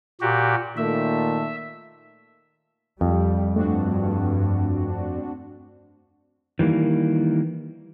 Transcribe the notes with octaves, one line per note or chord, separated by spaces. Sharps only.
A#2 F#4 G4
A#2 D#3 A3 E5
F2 G3
G2 A3 C4 D4 F#4
D#3 E3 G3 A#3